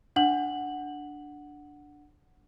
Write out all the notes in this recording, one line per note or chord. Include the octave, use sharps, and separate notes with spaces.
D4 F#5 F#7